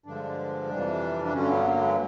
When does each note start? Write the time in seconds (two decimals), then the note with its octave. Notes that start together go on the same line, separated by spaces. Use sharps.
0.06 G2 D3 F3 G#3 D4
0.69 F2 C3 E3 G3
1.25 D4
1.33 G2 D3 F#3 C#4
1.50 B3
1.66 A#3
1.81 G#3